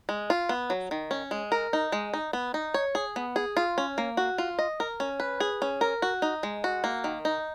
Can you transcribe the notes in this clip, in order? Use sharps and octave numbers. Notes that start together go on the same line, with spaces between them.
G#3
F4
B3
F#3
D#3
C#4
G#3
A#4
D#4
G#3
D#4
B3
D#4
C#5
G#4
B3
G#4
F4
C#4
A#3
F#4
F4
D#5
A#4
C#4
B4
G#4
C#4
A#4
F#4
D#4
G#3
F#4
A#3
D#3
D#4